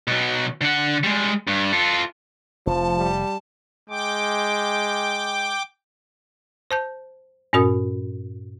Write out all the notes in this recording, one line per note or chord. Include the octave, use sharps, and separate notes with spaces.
B2 F#3
D3 F#5
G3 G#3
G2
F4 A4
F1 F3 A5
G3
G#3 G5 D6
C5 A5 G6
G2 A#2 C#4 F#4 A#4 D#6